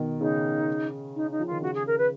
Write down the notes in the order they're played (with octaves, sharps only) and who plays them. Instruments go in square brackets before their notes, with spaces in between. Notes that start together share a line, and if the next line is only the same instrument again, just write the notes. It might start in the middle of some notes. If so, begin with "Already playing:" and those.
Already playing: [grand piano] B2 D#3
[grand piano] C#3 [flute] D#4
[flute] D#4
D#4
[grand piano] F3
[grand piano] D#3 [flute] F4
[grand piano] C#3 [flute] F#4
[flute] G#4
A#4
B4